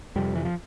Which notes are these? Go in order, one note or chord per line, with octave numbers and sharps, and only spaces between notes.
F2 C3 G3
E3
F3